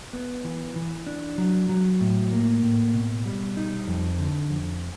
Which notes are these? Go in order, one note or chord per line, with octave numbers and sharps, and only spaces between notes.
B3
E3
E3
D4
F#3
F#3
A2
A#3
A2
B2
G3
D#4
F2
D3
F2